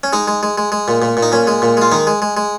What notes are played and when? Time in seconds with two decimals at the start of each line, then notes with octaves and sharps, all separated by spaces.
0.04 C#4
0.13 G#3 D#4
0.28 G#3
0.43 G#3
0.58 G#3
0.72 G#3
0.88 A#2
1.02 A#2
1.17 A#2
1.23 D#4
1.32 A#2 C#4
1.47 G#3
1.62 A#2
1.77 G#3 F4
1.92 D#3 D#4
2.07 G#3
2.22 G#3
2.37 G#3